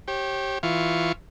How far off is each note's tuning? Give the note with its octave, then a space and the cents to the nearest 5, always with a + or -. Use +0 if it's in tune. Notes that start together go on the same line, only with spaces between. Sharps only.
G4 -10 C#5 -40
E3 +0 F4 +0 C#6 +0